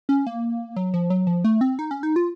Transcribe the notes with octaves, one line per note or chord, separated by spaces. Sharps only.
C#4
A#3
F#3
F3
F#3
F3
A3
C4
D#4
C#4
D#4
F4